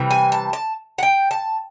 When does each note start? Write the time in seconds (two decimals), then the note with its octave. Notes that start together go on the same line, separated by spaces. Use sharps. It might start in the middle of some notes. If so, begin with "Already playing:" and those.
Already playing: C3 E3 G3
0.11 G#5
0.32 A5
0.53 A5
0.98 F#5
1.03 G5
1.31 A5